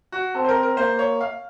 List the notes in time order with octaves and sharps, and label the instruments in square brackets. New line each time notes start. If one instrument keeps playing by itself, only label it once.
[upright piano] F#4
[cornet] C4 [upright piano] A4
[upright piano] C5
A#4
A#4
[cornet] A#3 [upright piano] C5
[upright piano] C#5
F5